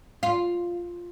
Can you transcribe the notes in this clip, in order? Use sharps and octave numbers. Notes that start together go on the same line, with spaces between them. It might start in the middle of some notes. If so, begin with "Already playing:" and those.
F4